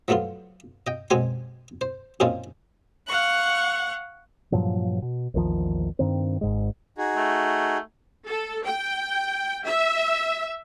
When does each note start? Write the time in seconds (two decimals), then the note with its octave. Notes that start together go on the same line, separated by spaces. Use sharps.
0.08 F3 F#3 A3 B3 F4
0.87 D#5 G5
1.10 F#2 B2 G#3 C4 G#5 C6
1.81 C5
2.20 F#2 A#2 C4 C#4 D#4 F4
3.08 F5 F#5 C#6 F#6
4.52 G2 A#2 F3 F#3
5.02 B2
5.34 A#1 E2 D#3 F3
5.99 G2 D#3 C4
6.41 G#1 G#2 G#3
6.98 D#4 F#4 G#4
7.16 A3
8.28 A4
8.66 G5
9.66 E5